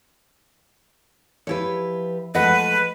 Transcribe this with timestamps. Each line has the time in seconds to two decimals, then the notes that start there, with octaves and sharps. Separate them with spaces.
1.47 F3 E4 G4 B4 C#5
2.35 F3 G#3 A3 B4 D#5 F#5